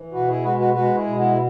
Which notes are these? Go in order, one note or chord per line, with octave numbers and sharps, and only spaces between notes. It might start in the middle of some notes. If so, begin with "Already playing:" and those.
Already playing: E3
B2 F#4 B4
E4 G#4
G#3 F#4 B4
F#4 B4
G#3 F#4 B4
E4 G#4
B2
B3 E4